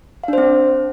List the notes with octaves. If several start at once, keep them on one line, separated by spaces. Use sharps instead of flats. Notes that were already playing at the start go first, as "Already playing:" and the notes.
C4 D4 C5 F5